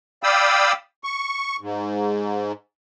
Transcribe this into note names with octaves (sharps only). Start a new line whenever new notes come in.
D5 F5 G5 B5 D#6 E6
C#6
G#2